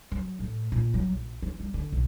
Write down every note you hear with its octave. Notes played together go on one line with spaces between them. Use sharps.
F#3
A2
A#2
F#3
A#1
E3
G3
D3
B1